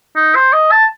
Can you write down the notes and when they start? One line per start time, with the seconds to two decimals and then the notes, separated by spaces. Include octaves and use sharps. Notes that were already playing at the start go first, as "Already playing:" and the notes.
0.16 D#4
0.35 C5
0.53 D#5
0.72 A5